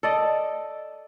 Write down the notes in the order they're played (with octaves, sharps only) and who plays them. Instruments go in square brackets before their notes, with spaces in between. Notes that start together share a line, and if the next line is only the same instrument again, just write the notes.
[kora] A4 D5 D#5